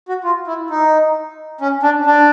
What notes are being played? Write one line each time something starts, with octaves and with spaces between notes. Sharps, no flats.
F#4
F4
E4
D#4
C#4
D4
D4